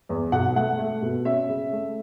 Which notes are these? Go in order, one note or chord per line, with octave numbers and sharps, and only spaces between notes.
E2
B1 F#5
A3 F#5
A3
B2
C#4 E5
C#3
A3